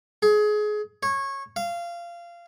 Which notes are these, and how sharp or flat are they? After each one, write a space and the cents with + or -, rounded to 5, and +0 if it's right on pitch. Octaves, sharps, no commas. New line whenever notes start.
G#4 +25
C#5 -20
F5 -20